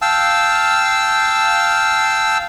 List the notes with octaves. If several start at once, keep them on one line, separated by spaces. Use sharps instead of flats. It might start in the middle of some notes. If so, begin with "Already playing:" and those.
F5 G5 A5 E6